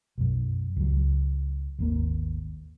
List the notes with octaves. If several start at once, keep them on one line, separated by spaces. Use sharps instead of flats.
B1 F#2
C#2 F#3
G#1 D#2 A#3